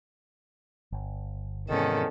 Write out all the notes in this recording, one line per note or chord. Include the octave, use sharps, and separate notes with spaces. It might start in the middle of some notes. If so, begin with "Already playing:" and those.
G1
E2 G#2 C3 D#3 C#4 A4